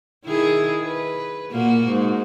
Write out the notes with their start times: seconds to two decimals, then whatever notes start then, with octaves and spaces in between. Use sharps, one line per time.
0.25 D#3 E4 G#4
0.84 B4
1.52 A#2 A#3 F#4
1.88 G#2